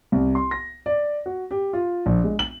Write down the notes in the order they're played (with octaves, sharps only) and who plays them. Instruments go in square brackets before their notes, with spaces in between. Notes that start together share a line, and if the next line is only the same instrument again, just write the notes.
[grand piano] C2
C6
A#6
D5
F#4
G4
F4
A#1
G#3
F#7